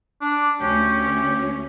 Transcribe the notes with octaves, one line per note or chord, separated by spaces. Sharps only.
D4
D2 C#4 G4